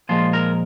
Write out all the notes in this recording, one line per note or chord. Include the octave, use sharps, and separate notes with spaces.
A#2 F3 G#3 F4
A#4